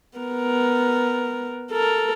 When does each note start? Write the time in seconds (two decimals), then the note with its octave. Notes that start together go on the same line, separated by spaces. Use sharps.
0.18 B3 A#4
1.71 A4 A#4